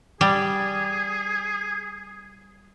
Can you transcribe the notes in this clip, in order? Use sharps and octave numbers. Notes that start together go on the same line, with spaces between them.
G3 G#4